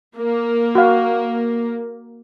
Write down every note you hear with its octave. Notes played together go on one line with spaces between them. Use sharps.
A#3
F#4 F5